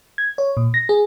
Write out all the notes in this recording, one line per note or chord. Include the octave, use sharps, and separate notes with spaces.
G#6
C#5
A#2
A#6
G#4